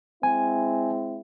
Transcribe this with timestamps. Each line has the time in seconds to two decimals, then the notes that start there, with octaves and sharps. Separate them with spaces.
0.23 G#3 C4 E4 G#5